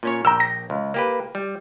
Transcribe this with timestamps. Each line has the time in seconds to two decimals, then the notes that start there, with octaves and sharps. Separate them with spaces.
0.03 A#2 C#4 C#5
0.25 A#1 G5 A#5 E6
0.40 A#6
0.70 C#2
0.94 A#3 G4 B4
1.35 G3